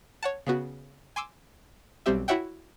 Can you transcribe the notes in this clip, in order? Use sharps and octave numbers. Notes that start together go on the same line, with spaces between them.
C#5 F#5 A5
C#3 B3 F#4
G#5 C6 D6 E6
B1 G3 C4 G4 E5
E4 F#4 C#5 E5 F#5 G5